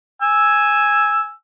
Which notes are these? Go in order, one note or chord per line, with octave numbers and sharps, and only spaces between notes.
G#5 E6